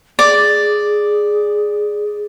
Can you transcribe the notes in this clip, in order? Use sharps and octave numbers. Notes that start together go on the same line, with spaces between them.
G#4 D5